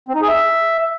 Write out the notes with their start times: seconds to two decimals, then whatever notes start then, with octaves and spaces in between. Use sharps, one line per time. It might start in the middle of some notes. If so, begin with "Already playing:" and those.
0.08 C4
0.15 D#4
0.22 G#4
0.28 E5